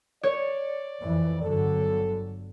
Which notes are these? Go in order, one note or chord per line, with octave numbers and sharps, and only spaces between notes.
C#5 D5
F2 E3
G1 D3 F#3 A4